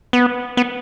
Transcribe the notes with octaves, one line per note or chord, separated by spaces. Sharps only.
B3
B3